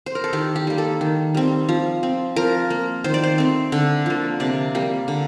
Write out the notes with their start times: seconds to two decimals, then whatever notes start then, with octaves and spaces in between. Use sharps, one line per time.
0.06 C5
0.15 A#4
0.24 A4
0.33 D#3 G4
0.56 G4
0.67 G3 A#3
0.78 A4
1.01 D#3
1.35 G3 C4
1.69 F3
2.03 C4
2.36 F3 A#4
2.70 A#3
3.04 D#3 C5
3.14 D5
3.23 C5
3.38 A3 C4
3.72 D3
4.06 F3 A#3
4.40 C3 D5
4.75 G3 A#3
5.08 D3